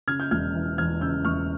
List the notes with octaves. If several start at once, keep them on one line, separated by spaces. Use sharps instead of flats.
C#3 F6 G#6
G6
E1 F6 G#6
E3
E2 F6 G#6
C#3 E6 G6
E1 C#6 F6